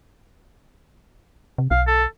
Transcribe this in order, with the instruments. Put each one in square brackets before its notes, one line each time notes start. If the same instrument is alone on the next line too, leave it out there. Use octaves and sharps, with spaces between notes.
[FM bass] C3
[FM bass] B1 [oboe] F5
[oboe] A4